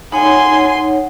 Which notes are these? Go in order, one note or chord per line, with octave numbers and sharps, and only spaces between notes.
D#4 C#5 F#5 G#5 C6